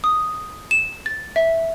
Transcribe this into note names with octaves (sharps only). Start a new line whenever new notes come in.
D#6
E7
A6
E5